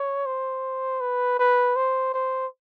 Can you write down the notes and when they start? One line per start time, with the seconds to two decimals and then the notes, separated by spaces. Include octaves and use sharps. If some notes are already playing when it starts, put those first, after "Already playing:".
Already playing: C#5
0.26 C5
1.01 B4
1.39 B4
1.76 C5
2.14 C5